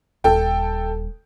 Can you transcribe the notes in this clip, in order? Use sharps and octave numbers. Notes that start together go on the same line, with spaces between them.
D#1 A4 G5